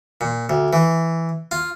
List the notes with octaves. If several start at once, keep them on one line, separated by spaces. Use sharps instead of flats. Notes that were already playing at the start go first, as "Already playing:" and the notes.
A#2
D2
E3
F4